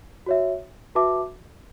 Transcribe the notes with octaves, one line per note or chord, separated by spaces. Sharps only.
F#4 C#5 E5
F#4 B4 E5 A5 D6